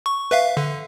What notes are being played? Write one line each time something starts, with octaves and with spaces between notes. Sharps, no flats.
C#6
B4 E5 F5
D3